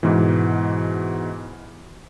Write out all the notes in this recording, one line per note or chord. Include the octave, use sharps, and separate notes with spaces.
G#2 B2 E3